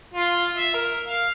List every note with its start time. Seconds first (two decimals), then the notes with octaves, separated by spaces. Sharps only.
0.14 F4
0.57 E5
0.74 A#4
1.08 F5